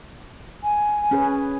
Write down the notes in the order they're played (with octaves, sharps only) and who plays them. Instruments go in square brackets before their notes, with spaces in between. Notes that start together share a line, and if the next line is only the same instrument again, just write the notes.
[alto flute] G#5
[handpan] C#4 G#4 B4